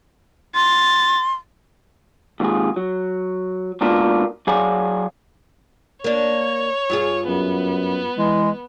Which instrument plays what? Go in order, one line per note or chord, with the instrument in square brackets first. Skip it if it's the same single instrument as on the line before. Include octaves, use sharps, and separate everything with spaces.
[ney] C6 [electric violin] A6
[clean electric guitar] D#2 G#2 F4 G#4
F#3
G#2 B2 A#3 D4 F4 A#4
F#3 G#4 C#5 D5 F5 G#5
[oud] A#3 D4 [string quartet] C#5
[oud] G2 F4 G#4
[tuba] F#2 [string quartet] B3
[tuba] E3 [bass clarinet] G#3